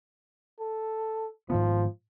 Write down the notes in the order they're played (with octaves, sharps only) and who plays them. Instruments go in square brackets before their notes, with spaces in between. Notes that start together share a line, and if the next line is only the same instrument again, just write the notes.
[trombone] A4
[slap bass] G#2 D#3 B3 [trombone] F3